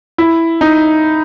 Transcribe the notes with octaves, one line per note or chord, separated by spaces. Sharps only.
E4
D#4